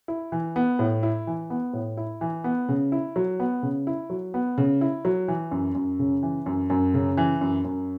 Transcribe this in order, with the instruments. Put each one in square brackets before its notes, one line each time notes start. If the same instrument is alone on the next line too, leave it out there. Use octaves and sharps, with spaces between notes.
[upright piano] E4
E3
B3
A2
E4
E3
B3
A2
E4
E3
B3
C#3
E4
F#3
B3
C#3
E4
F#3
B3
C#3
E4
F#3
E3
F#2
F#2
C#3
E3
F#2
F#2
C#3
E3
F#2
F#2